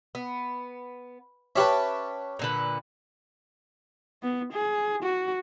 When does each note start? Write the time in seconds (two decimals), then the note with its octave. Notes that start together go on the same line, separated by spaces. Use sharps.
0.15 B3
1.56 C#4 G4 B4 E5 F#5 A5
2.39 A#2 D3 B4
4.23 B3
4.53 G#4
5.03 F#4